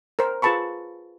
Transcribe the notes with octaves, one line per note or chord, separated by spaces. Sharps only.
A#4 C5
F4 G#4 B4 A5 B5 C#6